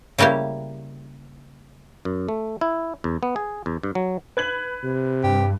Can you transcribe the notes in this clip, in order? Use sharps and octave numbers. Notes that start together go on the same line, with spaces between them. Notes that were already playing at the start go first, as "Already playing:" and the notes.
C#3 G3 A#3 E4 G4
F#2
A3
E4
E2
B3
G#4
E2
G2
F#3
B4 G#6 F#7
C3
G2 G4